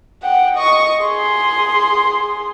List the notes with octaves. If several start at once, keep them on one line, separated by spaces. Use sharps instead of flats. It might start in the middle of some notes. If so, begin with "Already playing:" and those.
F#5 G5
D#5 C#6
G#4 C6